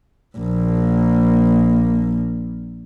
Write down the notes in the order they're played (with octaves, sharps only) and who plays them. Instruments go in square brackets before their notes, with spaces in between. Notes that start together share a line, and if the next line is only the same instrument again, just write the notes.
[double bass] A#1 A#3